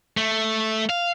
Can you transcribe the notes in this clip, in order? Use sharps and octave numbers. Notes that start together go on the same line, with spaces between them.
A3
F5